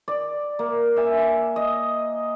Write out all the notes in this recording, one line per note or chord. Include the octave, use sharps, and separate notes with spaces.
D5
A#3
E5 G#5
D#5